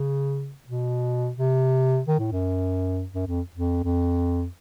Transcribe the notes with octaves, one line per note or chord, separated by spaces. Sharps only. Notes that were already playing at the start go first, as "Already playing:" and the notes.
Already playing: C#3
B2
C3
D#3
A2
F#2
F#2
F2
F2
F2